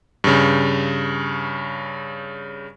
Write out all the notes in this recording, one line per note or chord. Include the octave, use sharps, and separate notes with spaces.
G2 C#3